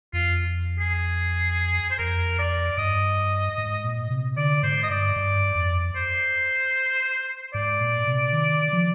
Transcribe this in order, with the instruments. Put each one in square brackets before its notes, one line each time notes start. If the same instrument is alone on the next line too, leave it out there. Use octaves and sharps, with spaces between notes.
[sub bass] F2 [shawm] F4
[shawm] G#4
C5
[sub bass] F2 [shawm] A#4
[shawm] D5
[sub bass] G2 [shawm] D#5
[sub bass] G#2
A#2
C3
[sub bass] D3 [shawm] D5
[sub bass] G#2 [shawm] C5
[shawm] D#5
[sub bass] G2 [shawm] D5
[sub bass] G2
F2
[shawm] C5
[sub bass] G#2 [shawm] D5
[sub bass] A#2
C3
D#3
F3